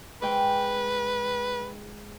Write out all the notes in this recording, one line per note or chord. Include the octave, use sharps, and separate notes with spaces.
G#2 B4 G5